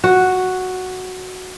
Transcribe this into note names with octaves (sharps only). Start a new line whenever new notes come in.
F#4